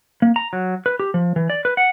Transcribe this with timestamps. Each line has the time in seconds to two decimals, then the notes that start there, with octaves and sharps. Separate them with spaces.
0.22 A#3
0.36 A#5
0.53 F#3
0.86 B4
1.00 G4
1.14 F3
1.36 E3
1.50 D5
1.65 B4
1.77 F#5